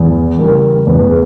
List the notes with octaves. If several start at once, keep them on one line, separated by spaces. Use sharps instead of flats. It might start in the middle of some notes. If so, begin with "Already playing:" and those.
Already playing: E2
C#3 G3 A#4
E2 B4
G#4